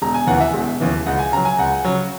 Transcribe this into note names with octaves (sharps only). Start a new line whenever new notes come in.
E1 A#5
G#5
D#2 C#3 E3 F#5
E5
E1
D#2 C#3 E3
C#2 F#5
G#5
C#3 F#3 A#5
G#5
C#2 F#5
C#3 F#3